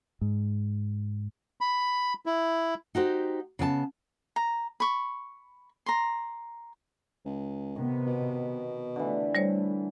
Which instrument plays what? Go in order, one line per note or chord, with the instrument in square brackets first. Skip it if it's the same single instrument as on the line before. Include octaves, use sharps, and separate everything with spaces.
[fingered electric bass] G#2
[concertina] B5
E4
[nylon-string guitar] D#4 F#4 G4 C5
C#3 B3 D5 A5
[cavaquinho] A#5
B5 C#6
A#5 C6
[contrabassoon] C#2
[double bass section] C3 B3 [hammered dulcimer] D#3
[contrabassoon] B2
[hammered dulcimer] D3 E3 [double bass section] A3
[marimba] G3 C5 C#5